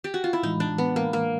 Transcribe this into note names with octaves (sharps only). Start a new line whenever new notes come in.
G4
F#4
F4
E4
A2 E3 G#3 D#4
D4
B3
A#3
A#3